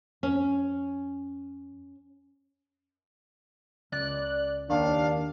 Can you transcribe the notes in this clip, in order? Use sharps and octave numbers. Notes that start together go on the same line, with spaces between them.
F2 C#4
C#2 D5 F#6
D#2 D#3 D4 F5